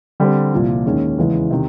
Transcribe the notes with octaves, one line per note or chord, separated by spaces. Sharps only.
D3 G3 C4
C2 A#2 F3
D#2 D#3 G#3 C#4
E2 C#3 E3 G#3
C3 D#3